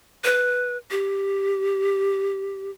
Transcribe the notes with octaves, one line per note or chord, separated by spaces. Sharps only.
B4
G4